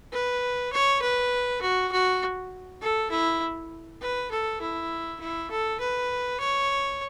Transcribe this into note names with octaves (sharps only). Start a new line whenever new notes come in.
B4
C#5
B4
F#4
F#4
A4
E4
B4
A4
E4
E4
A4
B4
C#5